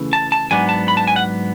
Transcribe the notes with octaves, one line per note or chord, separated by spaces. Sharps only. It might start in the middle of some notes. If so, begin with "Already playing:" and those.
Already playing: C#3 E3 A3
A5
A5
G#2 F#3 B3 D4 G#5
A5
B5
A5
G#5
F#5